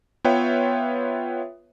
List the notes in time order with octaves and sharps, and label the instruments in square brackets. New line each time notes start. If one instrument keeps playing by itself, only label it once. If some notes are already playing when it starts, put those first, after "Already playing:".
[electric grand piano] B3 F4 B4 C#5 E5 G5